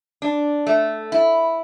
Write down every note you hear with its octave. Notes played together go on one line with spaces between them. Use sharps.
D4
A3
E4